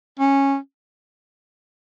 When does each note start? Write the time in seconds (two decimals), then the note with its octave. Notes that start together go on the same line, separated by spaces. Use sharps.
0.20 C#4